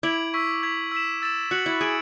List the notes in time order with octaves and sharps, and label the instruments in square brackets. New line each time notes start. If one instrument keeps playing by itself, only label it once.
[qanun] E4 [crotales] D6 G#6 D7 F#7
[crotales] C#6 E6 B6
D6 G#6 B6
E6 B6 E7
E6 A6 E7
[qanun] F#4 [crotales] F#6 C#7 F#7
[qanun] E4
[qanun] G#4 [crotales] G#6 D7 F#7